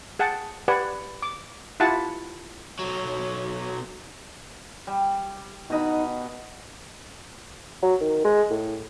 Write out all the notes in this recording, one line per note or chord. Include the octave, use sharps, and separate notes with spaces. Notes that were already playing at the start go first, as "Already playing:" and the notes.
G#4 F#5 G5 A5
G4 B4 D5 F#5 G#5
D6
E4 F4 G4 F#5 A5
B1 F#3
G3
B2 D#4 D#5 B5
F#3
D#3
G#3
A2